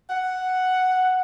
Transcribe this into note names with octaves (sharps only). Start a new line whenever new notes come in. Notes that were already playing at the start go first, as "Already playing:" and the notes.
F#5